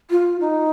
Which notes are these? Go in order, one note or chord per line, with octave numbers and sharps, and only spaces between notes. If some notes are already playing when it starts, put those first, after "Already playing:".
F4
D#4